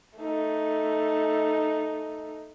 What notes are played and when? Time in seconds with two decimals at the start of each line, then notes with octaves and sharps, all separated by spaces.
0.19 A3 D#4